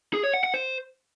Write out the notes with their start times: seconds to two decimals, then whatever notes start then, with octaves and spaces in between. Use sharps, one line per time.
0.14 G#4
0.24 C#5
0.34 F#5
0.44 F#5
0.54 C5